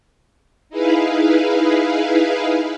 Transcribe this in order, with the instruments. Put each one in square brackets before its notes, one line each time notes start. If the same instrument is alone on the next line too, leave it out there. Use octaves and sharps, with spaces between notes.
[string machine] D#4 E4 G#4 B4 F5